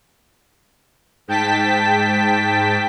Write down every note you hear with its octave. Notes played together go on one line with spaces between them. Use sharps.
G#2 G5 A5 B6